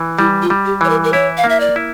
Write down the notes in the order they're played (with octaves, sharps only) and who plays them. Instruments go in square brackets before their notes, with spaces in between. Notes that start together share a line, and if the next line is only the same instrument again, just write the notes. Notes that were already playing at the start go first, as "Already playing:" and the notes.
Already playing: [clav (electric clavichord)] E3
[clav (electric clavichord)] G3 [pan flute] E4
[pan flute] F4
[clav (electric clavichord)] G3
[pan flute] G4
[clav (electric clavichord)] E3 [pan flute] C#5
[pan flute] A#4
A#4
[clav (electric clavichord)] E4 [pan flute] C#5
[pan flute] F5
[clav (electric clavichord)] A#3
[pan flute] E5
D5
[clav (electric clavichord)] E4